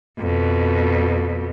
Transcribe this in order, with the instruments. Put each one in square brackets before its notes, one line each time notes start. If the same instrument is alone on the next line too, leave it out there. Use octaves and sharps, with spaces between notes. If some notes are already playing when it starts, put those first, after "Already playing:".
[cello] F2 B2